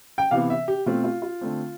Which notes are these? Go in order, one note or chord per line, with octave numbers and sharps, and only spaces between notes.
G5
C3 E3 B3 F5
E5
G4
B2 A3 C4 F4
F4
F4
D3 A3 C4